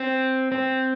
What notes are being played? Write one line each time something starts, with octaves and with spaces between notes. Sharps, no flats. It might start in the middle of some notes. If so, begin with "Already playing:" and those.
Already playing: C4
C4